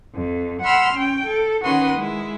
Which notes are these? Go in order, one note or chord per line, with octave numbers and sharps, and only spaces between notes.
F2
F#5 B5 C6 E6 F6
C#4 G5
A4
D#3 C#4 F#4 B4 C6 D#6
G#3 E4